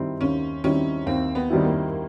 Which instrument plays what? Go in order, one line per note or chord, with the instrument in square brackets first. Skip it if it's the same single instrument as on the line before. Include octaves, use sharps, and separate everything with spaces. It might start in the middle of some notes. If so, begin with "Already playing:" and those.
Already playing: [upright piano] D#3 G3 C4 E4
[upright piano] D#2 [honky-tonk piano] C#4
[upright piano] D#3 G3 C4 E4 [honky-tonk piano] C#4
[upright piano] D#2 [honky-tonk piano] C4
[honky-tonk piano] B3
[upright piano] D#3 G3 C4 E4
[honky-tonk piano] A#3